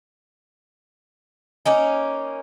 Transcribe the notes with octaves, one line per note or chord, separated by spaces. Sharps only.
A#3 C#4 D#4